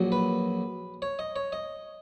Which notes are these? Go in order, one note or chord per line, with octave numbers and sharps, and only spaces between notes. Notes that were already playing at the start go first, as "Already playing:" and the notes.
Already playing: A#1 A#2 F#3
B4
C#5
D#5
C#5
D#5